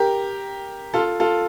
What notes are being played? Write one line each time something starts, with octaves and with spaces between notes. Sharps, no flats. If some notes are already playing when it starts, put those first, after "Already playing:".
Already playing: G4 A#4
F4 A4
F4 A4